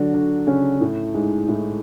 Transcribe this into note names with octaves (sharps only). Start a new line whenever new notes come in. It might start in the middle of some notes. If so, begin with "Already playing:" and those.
Already playing: D3 F#3 D4 F#4
D3 D4
C#3 C#4
A2 A3
G#2 G#3
A2 A3